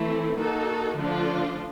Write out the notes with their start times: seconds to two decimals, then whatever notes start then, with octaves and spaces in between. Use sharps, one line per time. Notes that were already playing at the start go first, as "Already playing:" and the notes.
Already playing: E3 A3 C4 E4
0.37 A#3 D#4 F#4 A4
0.96 D3 F3 A3 D4 F4